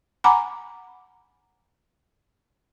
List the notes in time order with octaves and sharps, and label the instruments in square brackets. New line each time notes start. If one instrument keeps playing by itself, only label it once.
[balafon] F#5 G#5 A#5 B5 D6